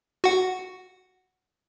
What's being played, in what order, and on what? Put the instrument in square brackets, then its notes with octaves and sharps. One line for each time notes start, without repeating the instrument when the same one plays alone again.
[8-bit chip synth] F#4 F#5